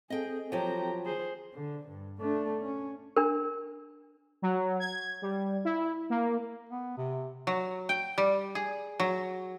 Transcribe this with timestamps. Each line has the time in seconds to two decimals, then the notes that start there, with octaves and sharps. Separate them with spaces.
0.10 C4 G#4 A4 D#5 G5
0.52 F3 F#3 G4 A#5
1.05 G#4 C5
1.54 D3
1.89 G2
2.21 A3 D4
2.61 C#4
3.16 D4 A#4
4.42 F#3
4.80 G#6
5.22 G3
5.65 E4
6.10 A#3
6.69 B3
6.97 C3
7.47 F#3
7.89 G5
8.18 G3
8.55 G#4
9.00 F#3